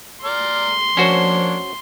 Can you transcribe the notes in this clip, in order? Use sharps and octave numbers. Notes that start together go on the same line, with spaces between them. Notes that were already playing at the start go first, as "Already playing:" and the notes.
D5 A#5 C6 F6
F3 A#3 C#4 D4 F#4 C5 C#5